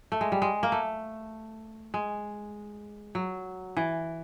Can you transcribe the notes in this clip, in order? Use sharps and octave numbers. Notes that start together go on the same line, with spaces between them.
A3
G#3
G3
G#3
A#3
A3
G#3
F#3
E3